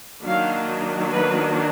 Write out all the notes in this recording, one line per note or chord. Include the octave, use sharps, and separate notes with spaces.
D#3 F#3 A#3 D4 F5
B4